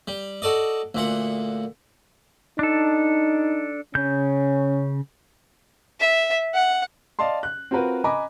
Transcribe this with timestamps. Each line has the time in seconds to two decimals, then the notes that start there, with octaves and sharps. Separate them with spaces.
0.08 G3
0.42 F#4 A4 D5 D#5
0.95 D2 A#2 F#5
2.59 D4 D#4 A4
3.95 C#3 C#4 G6
6.00 E5
6.54 F#5
7.19 D5 D#5 F5 A5 C6
7.43 F#6
7.71 C4 F4 F#4 A#4 B4
8.04 D#5 G#5 A#5 B5 D6